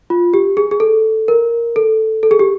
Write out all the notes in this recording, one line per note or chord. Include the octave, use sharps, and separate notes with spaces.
F4
G4
G#4
G#4
A4
A#4
A4
A4
G#4
G4